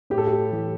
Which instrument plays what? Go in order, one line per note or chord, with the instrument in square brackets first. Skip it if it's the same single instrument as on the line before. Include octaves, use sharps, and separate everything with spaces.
[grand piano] A2 G4
A4
G4
E3